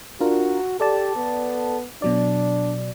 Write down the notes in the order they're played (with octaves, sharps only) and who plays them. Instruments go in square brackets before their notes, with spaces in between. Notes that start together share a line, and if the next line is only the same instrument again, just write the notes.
[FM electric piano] D4 F4 A#4 [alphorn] F#4
[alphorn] G4 [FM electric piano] A4 D5 A5
[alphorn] B3
[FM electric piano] B2 F#3 D5 [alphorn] D4